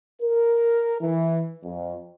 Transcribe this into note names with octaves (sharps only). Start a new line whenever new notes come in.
A#4
E3
F2